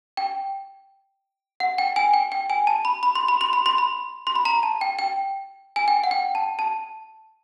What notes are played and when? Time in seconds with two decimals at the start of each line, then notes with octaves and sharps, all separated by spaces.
0.17 G5
1.60 F#5
1.78 G5
1.96 G#5
2.14 G5
2.32 G5
2.50 G#5
2.67 A5
2.85 B5
3.03 B5
3.15 C6
3.28 B5
3.41 C6
3.53 B5
3.66 C6
3.78 B5
4.27 C6
4.35 B5
4.45 A#5
4.63 A5
4.81 G5
4.99 G5
5.76 G#5
5.88 G5
6.04 F#5
6.11 G5
6.35 A5
6.59 A5